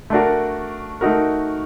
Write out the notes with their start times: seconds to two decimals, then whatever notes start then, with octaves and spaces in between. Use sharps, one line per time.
0.10 A3 D4 F#4 A#4
1.01 A3 D#4 F#4 A#4